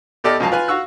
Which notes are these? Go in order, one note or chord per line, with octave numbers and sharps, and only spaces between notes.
E2 G4 A4 D5 D#5 F6
C#2 F3 F#3 F5 G#5 A5
F4 B4 G#5
F#4 F5 C#6 E6 F#6